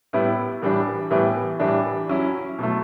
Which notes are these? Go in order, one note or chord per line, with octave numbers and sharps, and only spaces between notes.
A2 G3 B3 E4
A2 E3 G3 D4
A2 E3 G3 B3
A2 E3 G3 D4
F#3 C#4 E4
B2 F#3 A3